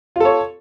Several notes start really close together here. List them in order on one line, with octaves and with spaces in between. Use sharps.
F4 A4 C#5